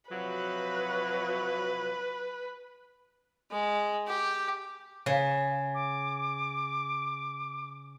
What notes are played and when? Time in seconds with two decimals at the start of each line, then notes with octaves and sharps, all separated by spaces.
0.11 C3 F3 F#3 B4
3.51 G#3
4.07 G4
5.06 C#3
5.75 D6